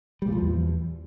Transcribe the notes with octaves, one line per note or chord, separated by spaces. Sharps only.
G3
A#2
F3
E2